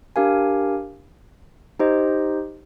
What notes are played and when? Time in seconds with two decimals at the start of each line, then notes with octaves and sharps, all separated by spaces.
0.16 D4 G4 A#4 F5 G#5
1.79 D#4 G4 C5 D#5